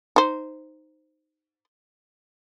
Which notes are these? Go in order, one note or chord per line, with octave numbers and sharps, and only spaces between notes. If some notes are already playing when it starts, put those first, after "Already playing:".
D#4 C5